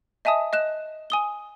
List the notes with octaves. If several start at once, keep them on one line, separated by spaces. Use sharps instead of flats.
D#5 E5 G#5 A5 D#6
D#5 F#6 E7
G#5 D#6 G7